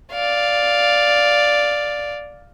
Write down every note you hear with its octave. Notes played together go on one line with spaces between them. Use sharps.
D5 F5